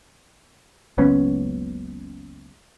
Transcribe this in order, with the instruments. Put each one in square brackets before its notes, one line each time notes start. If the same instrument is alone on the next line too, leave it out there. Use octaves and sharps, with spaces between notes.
[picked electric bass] F#1 C#2 B3 C#4